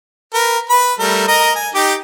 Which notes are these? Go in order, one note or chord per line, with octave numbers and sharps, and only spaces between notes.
A#4 B4
B4 B5
G3 A3 A#4
A#4 D#5 A#5
G#5
D#4 G4 D6